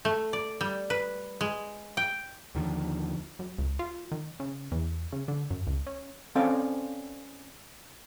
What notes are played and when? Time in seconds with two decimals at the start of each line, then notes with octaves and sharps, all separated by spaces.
0.05 A3
0.33 D5
0.61 G3
0.90 B4
1.41 G#3
1.97 G5
2.55 D#2 D3 D#3 F3
3.39 F#2
3.58 C#2
3.79 F4
4.11 D#3
4.40 C#3
4.72 E2
5.12 C#3
5.28 D3
5.51 F#2
5.67 C#2
5.87 C#4
6.35 C4 C#4 A4 D5 F5